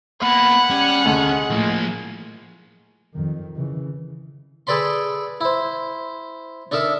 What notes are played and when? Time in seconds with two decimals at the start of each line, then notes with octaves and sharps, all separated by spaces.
0.22 A#3 B3 F#5 B5
0.70 G3 C#4
1.05 F1 D2 G#3 A4
1.50 A2 F3 A#3
3.14 F2 D#3
3.56 C#3 E3
4.67 G#4 A4 B4 D5 B5 C6
5.41 E4 C5
6.71 D4 D#4 A4 A#4 E5